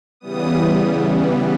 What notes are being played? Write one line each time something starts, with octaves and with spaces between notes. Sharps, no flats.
C#3 E3 G3 B3 D#6